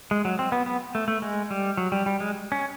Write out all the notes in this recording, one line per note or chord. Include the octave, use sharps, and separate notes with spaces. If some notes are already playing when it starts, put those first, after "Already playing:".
G#3
F#3
C4
B3
B3
A3
A3
G#3
G3
F#3
G3
G3
G#3
C#4